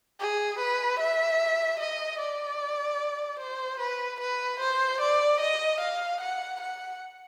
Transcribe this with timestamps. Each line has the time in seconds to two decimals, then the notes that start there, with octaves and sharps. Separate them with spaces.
0.20 G#4
0.59 B4
0.99 E5
1.80 D#5
2.20 D5
3.40 C5
3.80 B4
4.20 B4
4.60 C5
5.01 D5
5.40 D#5
5.80 F5
6.21 F#5
6.61 F#5